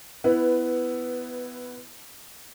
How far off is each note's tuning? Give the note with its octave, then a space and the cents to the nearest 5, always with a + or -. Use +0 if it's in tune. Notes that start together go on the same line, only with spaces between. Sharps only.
B3 +15 E4 +0 B4 +0